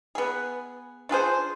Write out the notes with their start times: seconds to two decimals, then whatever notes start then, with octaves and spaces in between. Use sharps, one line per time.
0.15 B3 G#4
1.09 D4 F4 G#4 C5